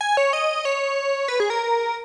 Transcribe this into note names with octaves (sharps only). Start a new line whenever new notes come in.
G#5
C#5
D#5
C#5
B4
G#4
A#4